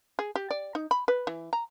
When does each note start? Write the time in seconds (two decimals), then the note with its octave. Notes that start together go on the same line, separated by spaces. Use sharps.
0.19 G#4
0.35 G4
0.51 D5
0.75 D#4
0.91 B5
1.08 B4
1.27 E3
1.53 A#5